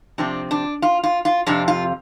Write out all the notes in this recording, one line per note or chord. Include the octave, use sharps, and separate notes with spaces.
C3 F3 C4 D4
D4
F4
F4
F4
F2 C3 F3 D4
F4